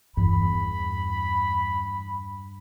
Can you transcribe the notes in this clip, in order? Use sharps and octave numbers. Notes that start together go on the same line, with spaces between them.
E2 G2 E3 B5